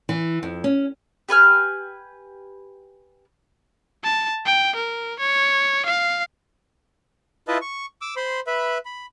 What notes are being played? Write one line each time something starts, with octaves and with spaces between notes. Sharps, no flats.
E3
F2
C#4
G4 B4 G#5 F6
A5
G5
A#4
C#5
F5
E4 F4 B4 D#5 E5 A5
C#6
D6 E6
C5 B5 C6
B4 E5 B5
B5